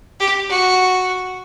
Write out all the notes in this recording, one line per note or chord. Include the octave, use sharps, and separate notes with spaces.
G4
F#4